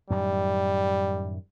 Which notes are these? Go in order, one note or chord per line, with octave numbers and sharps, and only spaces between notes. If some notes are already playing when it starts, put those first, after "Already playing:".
F#2 A2 D#3 G3